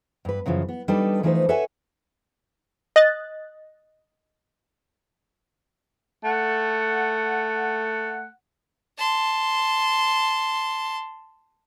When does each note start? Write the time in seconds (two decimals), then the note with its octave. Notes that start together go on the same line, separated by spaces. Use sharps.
0.25 G2 B4
0.46 F#2 C#3 E3 F3
0.69 B3
0.88 G3 D4 D#4 A4 B4
1.23 E3 F3 A3 D#4 B4 C5
1.49 A4 B4 C#5 E5 F#5 G#5
2.96 D#5 F#6 A6
6.24 A3 F#5
8.98 A5 C6